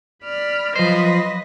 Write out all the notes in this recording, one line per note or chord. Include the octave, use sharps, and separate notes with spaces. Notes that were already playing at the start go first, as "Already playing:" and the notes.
D5 B5 F6
F3 F#3 B4 C5 D#5 A#6